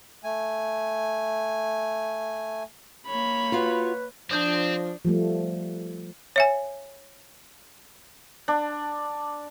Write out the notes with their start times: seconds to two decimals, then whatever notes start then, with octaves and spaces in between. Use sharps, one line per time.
0.24 A3 G#5
3.07 A#3 C#5 B5
3.52 F4 F#4 B4 F5
4.31 F3 C4 D4 D#6 G6
5.05 F3 G3 A3
6.36 C#5 E5 G#5
8.48 D4